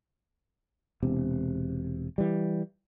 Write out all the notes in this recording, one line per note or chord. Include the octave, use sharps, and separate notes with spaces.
E1 C3
E3 G3